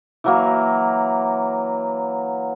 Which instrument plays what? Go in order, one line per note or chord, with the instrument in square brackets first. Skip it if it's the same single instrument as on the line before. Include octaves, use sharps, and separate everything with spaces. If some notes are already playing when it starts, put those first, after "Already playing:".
[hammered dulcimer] E3 F#3 A#3